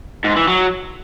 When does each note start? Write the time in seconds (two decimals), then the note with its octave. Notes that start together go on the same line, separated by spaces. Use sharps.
0.25 G#2
0.36 E3
0.48 F#3